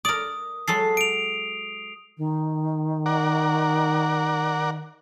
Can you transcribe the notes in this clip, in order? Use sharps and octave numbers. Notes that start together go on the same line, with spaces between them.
A#4 D5 D#6
F#3 G#3 A4 C7
D7 F7
D#3
A#4 D5 F#5